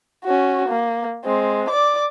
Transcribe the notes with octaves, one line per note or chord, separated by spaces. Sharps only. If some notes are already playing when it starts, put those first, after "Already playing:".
C#4 F#4
A#3
G#3 C4
D5 D6